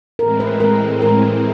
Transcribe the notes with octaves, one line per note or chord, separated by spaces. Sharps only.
A2 E3 G#3 C4 A#4
B4
A#4
A#4